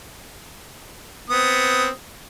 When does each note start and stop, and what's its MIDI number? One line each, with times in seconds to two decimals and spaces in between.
1.30 1.90 59
1.30 1.90 60
1.30 1.90 87